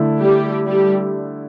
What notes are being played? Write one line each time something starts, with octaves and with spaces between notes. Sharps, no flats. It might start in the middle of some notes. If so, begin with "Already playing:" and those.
Already playing: D3 A3 E4 A4
G3 G4
G3 G4